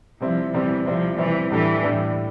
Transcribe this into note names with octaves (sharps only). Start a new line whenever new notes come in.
C3 F3 G3 C4 E4
C3 E3 G3 C4 E4
C3 F3 G3 C4 E4
C3 E3 G3 C4 E4
A2 E3 G3 D4 A4
A2 G3 D4 A4